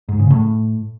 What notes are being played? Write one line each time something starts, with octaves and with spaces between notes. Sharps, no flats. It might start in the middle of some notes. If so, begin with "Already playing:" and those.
G#2
C#3
A2